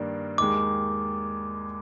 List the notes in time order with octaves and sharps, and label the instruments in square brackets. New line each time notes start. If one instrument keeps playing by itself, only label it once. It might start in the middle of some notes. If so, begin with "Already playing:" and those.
Already playing: [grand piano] G2 D#3 A#3 D4
[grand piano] D#2 D#3 G#3 [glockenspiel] D6